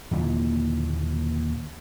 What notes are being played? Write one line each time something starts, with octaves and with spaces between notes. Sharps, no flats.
D#2 A#2 D3 E3